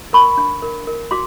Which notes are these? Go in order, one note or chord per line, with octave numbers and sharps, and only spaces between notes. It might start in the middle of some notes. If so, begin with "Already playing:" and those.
A#4 B5 C#6
D4
A#4
A#4
F#4 C6 D6